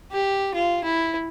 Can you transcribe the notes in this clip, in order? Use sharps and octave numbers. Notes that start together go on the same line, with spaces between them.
G4
F4
E4